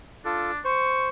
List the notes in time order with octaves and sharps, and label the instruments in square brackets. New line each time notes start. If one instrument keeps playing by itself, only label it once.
[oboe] D4 [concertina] F4 A4
[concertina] C5 [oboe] C#6